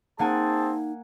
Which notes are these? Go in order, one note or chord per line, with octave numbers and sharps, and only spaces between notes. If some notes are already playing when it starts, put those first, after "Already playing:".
A#3 C4 D#4 G#4 F#5 G#5 A5